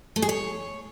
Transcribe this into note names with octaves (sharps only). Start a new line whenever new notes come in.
A3
G#4
C#5